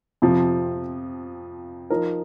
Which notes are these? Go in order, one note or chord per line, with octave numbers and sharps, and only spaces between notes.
F2 C3 F3
F3 D#4 A#4